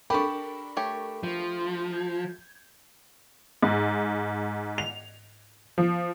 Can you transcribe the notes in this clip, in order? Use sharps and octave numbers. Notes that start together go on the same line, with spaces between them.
D4 G4 A4 A#4 B5 C#6
A3 G4 C#5
F3
G6 G#6
G#2
F7
F3